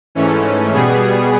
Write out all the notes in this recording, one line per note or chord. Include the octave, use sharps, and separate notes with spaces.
G#2 E3 A3 C#4
B2 G3 B3 G#4